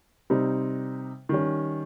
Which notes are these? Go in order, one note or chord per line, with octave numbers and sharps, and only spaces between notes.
C3 G3 C4 D#4
D#3 G3 C#4